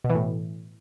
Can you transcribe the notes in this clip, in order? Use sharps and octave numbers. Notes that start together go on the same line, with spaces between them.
B2
E3
A2